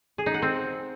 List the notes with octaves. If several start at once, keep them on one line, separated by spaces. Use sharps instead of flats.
G#4
D#4
F#5
C4